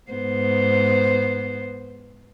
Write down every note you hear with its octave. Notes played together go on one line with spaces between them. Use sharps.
G#2 B3 C5